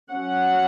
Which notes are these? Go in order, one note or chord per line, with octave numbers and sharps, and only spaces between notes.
F#3 C#4 F#5